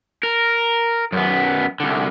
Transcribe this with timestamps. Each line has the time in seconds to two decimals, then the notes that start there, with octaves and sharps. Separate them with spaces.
0.23 A#4
1.12 F#2 B3
1.80 C2 D3